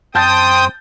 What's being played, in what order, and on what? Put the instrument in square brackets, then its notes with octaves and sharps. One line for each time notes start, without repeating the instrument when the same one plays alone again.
[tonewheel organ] F#2 [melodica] C4 C5 [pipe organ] G5 D#6 [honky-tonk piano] A5 G6 A6